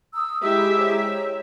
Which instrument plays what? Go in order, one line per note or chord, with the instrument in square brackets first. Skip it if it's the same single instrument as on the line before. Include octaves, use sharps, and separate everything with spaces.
[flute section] A#5 D#6 E6
[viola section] G#3 G4 E5 [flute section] E4 A#5 E6
[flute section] C5 C#5 A#5